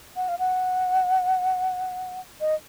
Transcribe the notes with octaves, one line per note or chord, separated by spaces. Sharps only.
F#5
F5
F#5
D#5